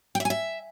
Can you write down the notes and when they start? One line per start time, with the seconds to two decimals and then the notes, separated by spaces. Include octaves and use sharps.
0.15 G5
0.20 E5
0.25 G#5
0.30 E5